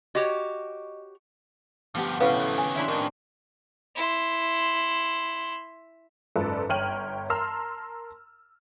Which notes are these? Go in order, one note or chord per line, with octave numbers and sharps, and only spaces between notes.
F#4 G4 C#5 D#5
D2 G2 F3 B3 G4
A2 C#3 B3 F#4 B4 F5
D#3 E3
G#5
G2 C#3 C4 D4 E4
A2 D#3
E4 C6
F#1 G#2 F4 A4 B4 D5
G1 C#5 G5 F6 D#7 F#7
A#4 A5 A#5 C6 E6 F6